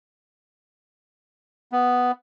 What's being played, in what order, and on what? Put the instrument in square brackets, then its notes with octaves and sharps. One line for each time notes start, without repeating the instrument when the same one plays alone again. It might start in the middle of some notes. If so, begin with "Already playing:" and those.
[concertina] B3